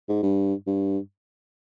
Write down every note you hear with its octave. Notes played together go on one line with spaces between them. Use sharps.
G#2
G2
G2